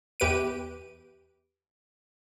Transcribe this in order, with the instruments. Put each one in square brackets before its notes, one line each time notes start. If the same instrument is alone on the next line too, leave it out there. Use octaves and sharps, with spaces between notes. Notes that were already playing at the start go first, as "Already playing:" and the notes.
[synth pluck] E2 G4 B4 D7 D#7